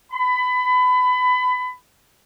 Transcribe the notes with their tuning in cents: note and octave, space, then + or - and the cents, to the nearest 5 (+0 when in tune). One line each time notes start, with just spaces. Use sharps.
B5 +25